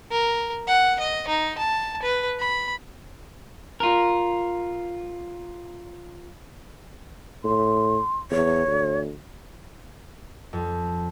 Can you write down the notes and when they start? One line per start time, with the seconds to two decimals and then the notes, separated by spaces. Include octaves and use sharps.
0.11 A#4
0.67 F#5
1.00 D#5
1.28 D#4
1.58 A5
2.02 B4
2.40 B5
3.80 F4 A#4
7.44 A2 C6
8.31 E2 C#5
8.67 D2
10.53 F2